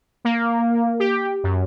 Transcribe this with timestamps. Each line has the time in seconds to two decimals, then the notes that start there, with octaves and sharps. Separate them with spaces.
0.25 A#3
1.00 G4
1.44 F#2